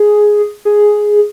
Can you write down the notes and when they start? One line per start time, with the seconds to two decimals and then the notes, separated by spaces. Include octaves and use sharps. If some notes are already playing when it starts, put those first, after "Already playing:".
Already playing: G#4
0.65 G#4